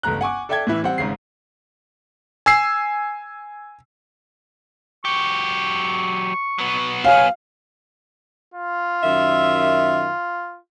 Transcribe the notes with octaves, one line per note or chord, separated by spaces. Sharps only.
G1 C#2 A3 A#5 F#6
F#5 G#5 C#6 D6
A4 D5 E5 G5 A5 G#6
A2 E3 E4
G3 C4 F#5
G#1 G#2 C#3 C7
G#5 E6 C7
F#3 G4 C#6
F#3 B3
C#5 F5 G#5 F6
F4
F#2 D#3 E5